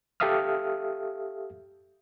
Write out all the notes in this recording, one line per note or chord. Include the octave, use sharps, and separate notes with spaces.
G4 A4 E5 F5 D#6 F6